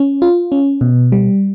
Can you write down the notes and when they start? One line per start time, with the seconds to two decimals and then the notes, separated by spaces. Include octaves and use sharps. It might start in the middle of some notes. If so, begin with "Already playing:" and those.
Already playing: C#4
0.22 F4
0.52 C#4
0.81 B2
1.12 G3